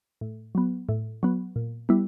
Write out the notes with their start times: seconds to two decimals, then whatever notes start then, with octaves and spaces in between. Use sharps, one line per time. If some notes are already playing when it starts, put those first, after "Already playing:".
0.21 A2
0.55 F#3 B3
0.89 A2
1.23 F#3 B3
1.56 A#2
1.89 G3 B3 E4